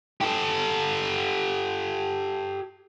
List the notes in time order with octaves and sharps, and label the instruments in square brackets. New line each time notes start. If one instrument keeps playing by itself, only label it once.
[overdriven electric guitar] G4 A4